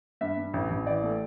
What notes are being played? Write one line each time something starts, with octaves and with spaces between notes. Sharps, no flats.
G2 E5
G2
A1
A1
E3 D5
A3